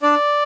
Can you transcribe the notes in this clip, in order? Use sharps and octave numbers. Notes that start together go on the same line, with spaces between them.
D4 D5